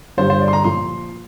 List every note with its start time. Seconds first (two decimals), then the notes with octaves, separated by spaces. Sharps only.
0.17 G1 G2 G3 C5
0.30 C5
0.41 D5
0.48 C6
0.53 A#5
0.64 A#2 F3 C6